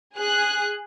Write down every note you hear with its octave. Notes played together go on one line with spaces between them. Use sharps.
G#4 F#6